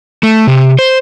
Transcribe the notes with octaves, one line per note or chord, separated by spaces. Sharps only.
A3
C3
C5